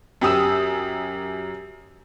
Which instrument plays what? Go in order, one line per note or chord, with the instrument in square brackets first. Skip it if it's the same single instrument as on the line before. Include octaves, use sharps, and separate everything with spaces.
[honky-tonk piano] F#2 G4 D#6 E6